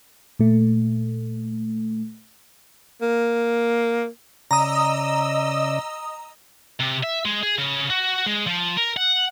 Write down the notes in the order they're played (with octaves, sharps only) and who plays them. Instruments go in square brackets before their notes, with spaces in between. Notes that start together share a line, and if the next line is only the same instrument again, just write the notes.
[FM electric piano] A#2 A3
[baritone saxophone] A#3
[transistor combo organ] C#3 D5 [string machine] D#5 E6 [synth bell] A#5 D#6
[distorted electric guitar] C3
E5
G#3
G#4
C#3
F#4
G#3
F3
A#4
F#5